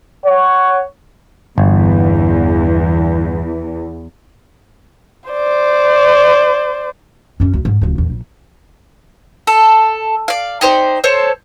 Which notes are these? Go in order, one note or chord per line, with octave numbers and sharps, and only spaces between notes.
C#5 F#5
G1 E2
C5 D5
F#2 C#4
D2
G#2
D1 C#2
E2 A#2
A#1
A4
D5 F5
D#4 G4 C5 D5
A4 C5 C#5